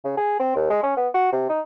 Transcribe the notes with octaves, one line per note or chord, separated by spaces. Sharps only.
C#3
G#4
C4
D#2
G#3
C#4
B3
F#4
C3
D#4